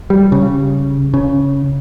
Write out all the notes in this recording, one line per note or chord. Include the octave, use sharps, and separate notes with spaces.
G3
C#3
C#3